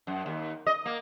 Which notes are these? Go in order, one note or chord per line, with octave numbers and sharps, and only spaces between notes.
F#2
D#2
D#5
A#3